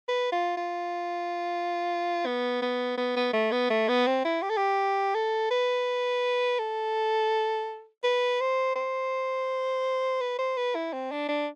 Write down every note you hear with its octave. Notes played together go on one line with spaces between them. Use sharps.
B4
F4
F4
B3
B3
B3
B3
A3
B3
A3
B3
C4
E4
G4
A4
G4
A4
B4
A4
B4
C5
C5
B4
C5
B4
E4
C4
D4
D4